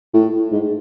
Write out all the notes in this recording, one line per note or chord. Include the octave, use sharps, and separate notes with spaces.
A2
G#2